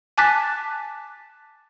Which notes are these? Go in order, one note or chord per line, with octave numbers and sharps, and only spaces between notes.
G#5 A5 D6 F#6 A6 B6